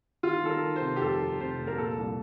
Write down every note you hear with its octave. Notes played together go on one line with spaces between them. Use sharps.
D#3 F4
D#3 A4
A#4
D#3
C5
C3
G4
F1 A4
F1
C3 C5
F1
A#4
A#2 A4
C2